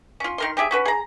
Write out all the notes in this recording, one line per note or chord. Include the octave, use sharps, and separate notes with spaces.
C#4 F4
D#3 A#4 C6
C4 G4 G#4 E5
C#4 F#4 B4
G#4 A#5